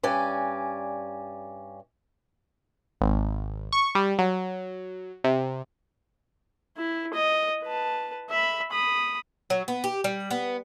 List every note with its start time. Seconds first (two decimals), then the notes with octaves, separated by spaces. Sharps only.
0.03 G2 C#4 D5 G#5
3.01 G#1
3.73 C#6
3.95 G3
4.19 F#3
5.24 C3
6.77 E4
7.14 D#5
7.63 B4 A5
8.30 E5 B5
8.71 B5 D#6
9.50 F#3
9.68 B3
9.84 G4
10.04 G3
10.30 B3